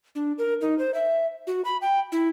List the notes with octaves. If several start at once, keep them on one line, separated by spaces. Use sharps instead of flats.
D4
A#4
D#4
C5
E5
F#4
B5
G5
E4